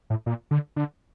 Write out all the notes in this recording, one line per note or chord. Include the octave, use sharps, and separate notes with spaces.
A2
A#2
D3
D3